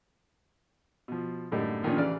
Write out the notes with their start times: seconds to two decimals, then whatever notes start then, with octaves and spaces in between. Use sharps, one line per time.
1.08 B2 F3
1.52 F#2 A2 D3 G3 A#3 D#4
1.83 A#2 D#3 F3 C#4 D4
1.96 A1 C#3 E3 D5 F6